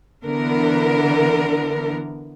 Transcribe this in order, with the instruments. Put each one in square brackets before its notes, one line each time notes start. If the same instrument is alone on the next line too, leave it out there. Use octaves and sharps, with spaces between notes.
[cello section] D3 E3 B3 A#4